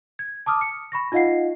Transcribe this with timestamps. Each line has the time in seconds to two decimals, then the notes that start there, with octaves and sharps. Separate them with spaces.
0.19 G#6
0.46 A5 D6 D#6 F6
0.61 C#7
0.92 B5 C#6 A#6
1.12 D#4 F4 D#5 F5 F#5 C7